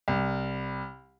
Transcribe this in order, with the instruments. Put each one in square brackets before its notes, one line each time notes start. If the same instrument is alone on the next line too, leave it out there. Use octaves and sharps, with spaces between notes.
[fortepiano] C2